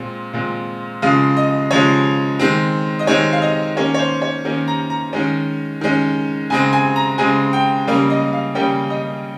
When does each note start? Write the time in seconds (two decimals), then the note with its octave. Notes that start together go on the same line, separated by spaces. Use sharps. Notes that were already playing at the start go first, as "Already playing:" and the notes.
Already playing: A#2 G#3 C4
0.33 A#2 G#3 C4
1.02 C#3 F3 G#3 F5
1.37 D#5
1.71 C#3 F3 G#3 C#5
2.39 D#3 G#3 C4
2.99 D#5
3.07 D#3 G#3 C4 C#5
3.32 F5
3.42 D#5
3.76 D#3 A#3 C#4 C#5
3.94 C#5
3.99 C5
4.22 C#5
4.45 D#3 A#3 C#4
4.68 A#5
4.90 A#5
5.13 D#3 G#3 C#4
5.81 D#3 G#3 C#4
6.50 C#3 G#3 C4 G#5
6.73 G#5
6.96 A#5
7.18 C#3 G#3 C4 G#5
7.53 G5
7.87 C#3 G3 A#3 C#4 F5
8.10 D#5
8.33 F5
8.55 C#3 G3 A#3 C#4 G5
8.90 D#5